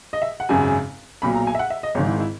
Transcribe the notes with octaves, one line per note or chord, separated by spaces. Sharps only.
D#5
E5
F#5
G#1 F#2 C#3 G#5
B1 A#2 F#3 B5
A#5
G#5
E5
F#5
E5
D#5
G#1 G#2 D#3 C#5
E4
E4